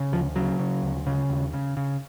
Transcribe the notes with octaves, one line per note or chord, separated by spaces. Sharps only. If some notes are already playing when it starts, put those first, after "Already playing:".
Already playing: C#3
D2 F3
C#3 F#3
C#3
D2
C#3
D#2
C#3
C#3